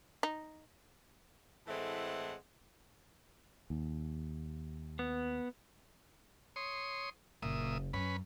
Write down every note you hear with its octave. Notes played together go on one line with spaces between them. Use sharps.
D#4
A2 E3 G#3 A3 C4 F#5
D#2
B3
C#5 C6 D#6
F#1 A#2 E5 D#6
F#2 C#4 B4 B5